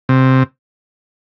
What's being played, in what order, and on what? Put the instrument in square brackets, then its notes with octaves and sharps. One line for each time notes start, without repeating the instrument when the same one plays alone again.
[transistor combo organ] C3